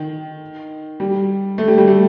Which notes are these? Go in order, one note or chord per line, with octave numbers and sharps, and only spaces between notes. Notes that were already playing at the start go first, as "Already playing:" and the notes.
Already playing: D#3
G3
A3
G3
G3
A3